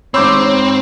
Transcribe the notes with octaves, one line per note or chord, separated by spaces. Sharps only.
G#2 C4 C#5 B5 C6 D6 E6 G6